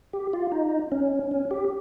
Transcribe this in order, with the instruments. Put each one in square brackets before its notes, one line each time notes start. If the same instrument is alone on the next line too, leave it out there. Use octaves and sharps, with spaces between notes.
[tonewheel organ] G4
F4
D#4
C#4
C#4
G4